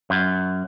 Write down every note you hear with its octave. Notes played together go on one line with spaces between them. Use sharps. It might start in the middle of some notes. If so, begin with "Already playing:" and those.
F#2